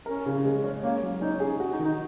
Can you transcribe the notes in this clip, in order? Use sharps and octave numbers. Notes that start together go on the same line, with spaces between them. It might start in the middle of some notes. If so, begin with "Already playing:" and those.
C#4 A#4
C#3
G#3
C#4
A#3 C#5
F#3
C#4 D#4
G#4
F#4
D#4
D#3
D#4